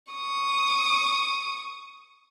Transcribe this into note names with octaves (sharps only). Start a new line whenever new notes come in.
C#6 D#6